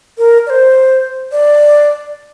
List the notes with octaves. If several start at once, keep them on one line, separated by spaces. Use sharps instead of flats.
A#4
D5
C5
D5